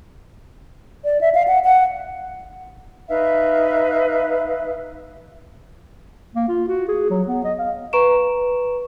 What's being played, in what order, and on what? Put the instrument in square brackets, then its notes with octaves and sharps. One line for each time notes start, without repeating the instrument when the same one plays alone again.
[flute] D5
E5
F5
F#5
F#5
[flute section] D#4 B4 E5 F5
[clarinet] A#3
F4
F#4
G#4
F#3
B3
D#5
F5
[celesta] B4 A#5 C#6 D7 E7